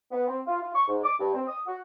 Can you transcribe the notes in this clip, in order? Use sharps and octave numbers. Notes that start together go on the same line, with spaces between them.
B3
C4
F4
F4
C#6
G#2
D6
G2
C4
D#6
F#4